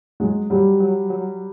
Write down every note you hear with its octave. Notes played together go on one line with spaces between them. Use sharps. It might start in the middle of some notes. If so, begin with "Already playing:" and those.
F#3 G#3
F#3 G3
F#3
F#3